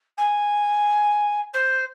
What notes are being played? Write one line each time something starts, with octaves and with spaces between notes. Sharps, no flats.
G#5
C5